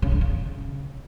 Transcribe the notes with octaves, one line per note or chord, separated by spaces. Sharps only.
C#3
D3
C#3